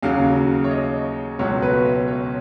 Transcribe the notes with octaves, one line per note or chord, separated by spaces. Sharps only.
D#2 C#3 F#3 F5
C#5
D#5
C#2 B2 F#3 C#5
B4
C#5
C#5